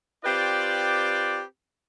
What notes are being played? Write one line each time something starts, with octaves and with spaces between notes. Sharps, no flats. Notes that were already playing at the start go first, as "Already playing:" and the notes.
C4 F4 G4 B4 D5